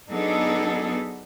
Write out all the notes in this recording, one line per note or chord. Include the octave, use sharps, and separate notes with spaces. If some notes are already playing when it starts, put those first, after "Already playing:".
F#3 B3 D4 D#4 G#4 A4